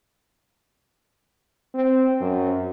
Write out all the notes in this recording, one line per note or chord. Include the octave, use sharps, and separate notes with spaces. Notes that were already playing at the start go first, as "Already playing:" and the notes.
C4
F#2